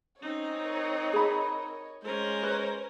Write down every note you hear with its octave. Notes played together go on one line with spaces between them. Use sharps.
C4 C#4 D#4 C#5 D#5
A#4
G#4 B5
G#3 C#4 A#4 C5
B4